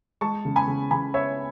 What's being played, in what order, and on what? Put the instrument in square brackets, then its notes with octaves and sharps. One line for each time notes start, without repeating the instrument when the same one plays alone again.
[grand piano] G#3 A5 C#6
C#3
G#5 B5
C#3
C#3 G#5 B5
B3 C#5 E5